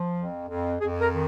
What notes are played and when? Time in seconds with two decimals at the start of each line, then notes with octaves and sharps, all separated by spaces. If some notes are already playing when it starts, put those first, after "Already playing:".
Already playing: F3
0.16 F2
0.48 F2
0.80 F2 G#4
1.01 A#4
1.12 D#3